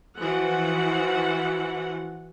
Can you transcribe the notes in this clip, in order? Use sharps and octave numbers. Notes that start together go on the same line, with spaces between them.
E3 F3 F#4 F#5